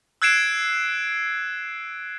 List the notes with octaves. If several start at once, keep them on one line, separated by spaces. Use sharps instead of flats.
E6 F#6 G#6 C7 D7 E7